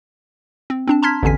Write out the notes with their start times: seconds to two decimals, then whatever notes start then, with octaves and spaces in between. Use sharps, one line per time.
0.70 C4
0.87 C4 D4 A5
1.03 A5 A#5 C6 F6 G#6 B6
1.23 A1 E2 D3 G#5 B6